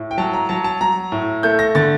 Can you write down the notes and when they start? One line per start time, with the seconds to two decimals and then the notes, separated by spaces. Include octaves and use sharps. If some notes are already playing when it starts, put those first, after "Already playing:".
Already playing: A2
0.11 G5
0.18 F#3 A5
0.34 A#5
0.49 F#3 A5
0.64 A5
0.81 F#3 A#5
1.12 A2
1.43 A3 G6
1.59 A#6
1.75 D3 A6